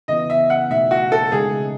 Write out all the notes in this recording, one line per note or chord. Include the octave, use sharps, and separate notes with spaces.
C#3 E3 B3 E4 D#5
E5
F#5
B2 A3 D#4 E5
F#4
A4
C#3 G#3 D#4 G#4